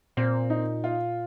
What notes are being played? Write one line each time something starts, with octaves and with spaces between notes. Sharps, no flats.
A#2 C4
D#4
F4